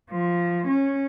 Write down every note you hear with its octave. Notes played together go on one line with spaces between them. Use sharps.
F3
C#4